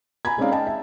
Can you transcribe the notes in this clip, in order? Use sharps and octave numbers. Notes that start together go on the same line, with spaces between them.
G#5 A#5 B5 G#6
G#3 C4 C#4 D#4 D5 F5
D#5 G5 A5
E5